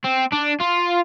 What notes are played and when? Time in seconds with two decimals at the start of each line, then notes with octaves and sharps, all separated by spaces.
0.05 C4
0.33 D4
0.61 F4